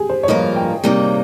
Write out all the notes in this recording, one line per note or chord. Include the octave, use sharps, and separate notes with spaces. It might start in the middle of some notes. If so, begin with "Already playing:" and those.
Already playing: G4 G#4
C5
C#5
G2 F3 A#3 F4 A#4 D#5
G5
C3 G3 A#3 D#4